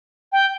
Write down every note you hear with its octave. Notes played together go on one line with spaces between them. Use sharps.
G5